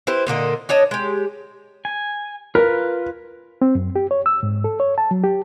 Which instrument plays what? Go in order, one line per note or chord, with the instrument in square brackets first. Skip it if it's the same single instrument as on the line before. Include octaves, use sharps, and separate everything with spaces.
[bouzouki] E4 G4 B4 C5
A#2 D3 A#3 D#5
D4 C#5 D#5 A5
G#3 G4
[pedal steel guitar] G#5
[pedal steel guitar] F4 B4 [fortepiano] A#4
[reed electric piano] C4
F#2
G4
C#5
E6
G#2
A4
C#5
A5
F#3
G4